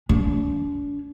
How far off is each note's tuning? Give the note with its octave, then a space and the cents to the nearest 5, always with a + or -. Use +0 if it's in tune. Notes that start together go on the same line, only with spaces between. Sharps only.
D4 -45